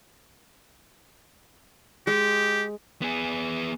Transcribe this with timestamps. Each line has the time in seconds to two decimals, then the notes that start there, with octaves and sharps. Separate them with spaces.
2.07 G#3 G4
3.02 B3 G#4